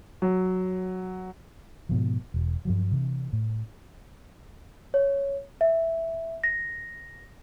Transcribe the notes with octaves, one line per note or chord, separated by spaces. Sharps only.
F#3
G#2 B2 F3
E1
G2 F3 F#3
C3 E3
A2
C#5
E5
A#6